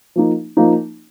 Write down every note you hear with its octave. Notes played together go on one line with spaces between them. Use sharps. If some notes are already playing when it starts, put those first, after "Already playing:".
F3 A#3 D#4
F3 A#3 D#4